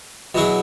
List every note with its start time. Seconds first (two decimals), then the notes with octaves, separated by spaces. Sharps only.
0.35 B2 F#3 E4 G#4